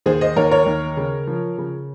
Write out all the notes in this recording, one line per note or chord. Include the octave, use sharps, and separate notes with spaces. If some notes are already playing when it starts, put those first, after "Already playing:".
D#2 G#4 C5
C5 D#5
D#2 A#4 C#5
A#4 C#5
D#2
C#3
F3
C#3